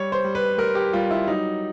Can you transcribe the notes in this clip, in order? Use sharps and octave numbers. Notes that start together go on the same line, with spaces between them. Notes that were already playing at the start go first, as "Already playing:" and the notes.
Already playing: G3 C#5
C5
G3
B4
G3 A#4
G4
G3 F4
E4
F#3 D#4